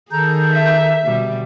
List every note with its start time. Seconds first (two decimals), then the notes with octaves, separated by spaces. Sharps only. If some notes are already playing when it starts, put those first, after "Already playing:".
0.11 D#3 G#4 A4 A#5 G6
0.52 E5
1.04 B2 D3 G3